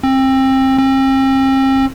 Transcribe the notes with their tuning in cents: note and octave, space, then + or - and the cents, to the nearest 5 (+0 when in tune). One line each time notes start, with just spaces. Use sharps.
C4 +25
C4 +40